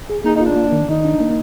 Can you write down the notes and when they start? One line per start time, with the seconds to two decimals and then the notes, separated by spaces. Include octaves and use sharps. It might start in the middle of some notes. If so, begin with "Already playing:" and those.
0.09 G#4
0.24 A#3 D#4
0.35 D#4
0.40 F4
0.46 D4
0.56 A#3
0.72 D#3
0.88 D#3 D#4
1.05 D4
1.20 A#3